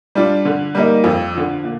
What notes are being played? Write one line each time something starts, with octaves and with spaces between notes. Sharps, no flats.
G3 D4 F4
D3
G3 A#3 D#4
F2
D3 F3
A#2